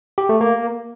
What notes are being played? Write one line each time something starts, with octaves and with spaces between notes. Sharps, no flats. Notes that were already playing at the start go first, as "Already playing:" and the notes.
G4
A3
A#3